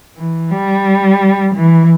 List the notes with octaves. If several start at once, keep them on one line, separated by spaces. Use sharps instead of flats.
E3
G3
E3